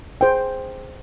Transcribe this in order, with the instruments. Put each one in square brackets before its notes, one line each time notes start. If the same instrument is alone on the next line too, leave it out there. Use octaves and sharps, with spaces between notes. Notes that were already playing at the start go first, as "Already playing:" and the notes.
[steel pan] G#4 C5 G5